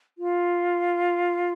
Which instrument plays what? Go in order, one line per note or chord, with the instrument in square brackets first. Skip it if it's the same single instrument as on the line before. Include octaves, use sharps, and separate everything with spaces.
[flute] F4